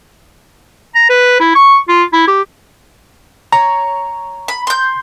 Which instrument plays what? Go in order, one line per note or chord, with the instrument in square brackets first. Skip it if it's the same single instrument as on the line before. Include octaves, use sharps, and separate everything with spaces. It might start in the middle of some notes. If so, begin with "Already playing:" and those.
[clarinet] A#5
B4
E4
C#6
F4
E4
G4
[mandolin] C#5 [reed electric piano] A#5
[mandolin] B5
C6 G6